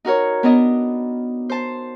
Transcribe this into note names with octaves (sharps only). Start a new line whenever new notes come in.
D#4 F#4 A#4 C#5
B3 D4 D#4 D#5
C5 A5